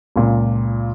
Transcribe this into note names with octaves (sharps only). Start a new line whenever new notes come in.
C#2 A#2